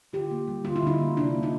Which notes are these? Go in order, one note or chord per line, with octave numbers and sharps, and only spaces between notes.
D3 F4 G4
A#3
G3
D3 F4
E4
D3 D#4 F4
A#3
C3 D4 E4
A#3
D#4 F4